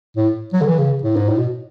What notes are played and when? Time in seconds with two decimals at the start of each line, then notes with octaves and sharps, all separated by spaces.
0.16 A2
0.53 F#3
0.61 D3
0.66 E3
0.79 C#3
1.03 A2
1.16 G#2
1.28 A2
1.37 B2